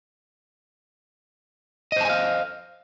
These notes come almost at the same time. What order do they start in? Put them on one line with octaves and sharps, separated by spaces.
D#5 C5 A5 G#5 F5